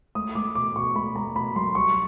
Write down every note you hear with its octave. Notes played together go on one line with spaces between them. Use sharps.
A3 D#6
A3 D6
B2 D6
B2 C#6
A3 B5
A3 A#5
B2 B5
F#3 C6
G3 C#6